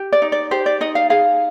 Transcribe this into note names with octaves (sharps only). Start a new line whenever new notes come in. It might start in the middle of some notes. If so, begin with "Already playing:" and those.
Already playing: G4
D5
D#4
D5
G4 C5
D5
D#4 D#5
F5
G#4 F5